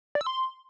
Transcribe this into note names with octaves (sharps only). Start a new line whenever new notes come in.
D5
E6
C6